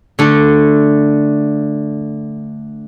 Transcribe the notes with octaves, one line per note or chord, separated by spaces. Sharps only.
D3 A3